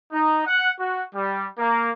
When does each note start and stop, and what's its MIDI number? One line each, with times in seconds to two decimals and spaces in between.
0.11 0.44 63
0.46 0.70 78
0.79 1.02 66
1.14 1.45 55
1.58 1.90 58